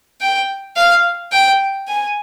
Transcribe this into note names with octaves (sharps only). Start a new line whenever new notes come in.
G5
F5
G5
G#5